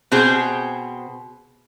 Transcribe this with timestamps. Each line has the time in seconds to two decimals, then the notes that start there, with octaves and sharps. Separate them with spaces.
0.11 B2 C4 G#4 C5